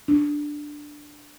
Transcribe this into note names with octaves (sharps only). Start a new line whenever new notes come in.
D4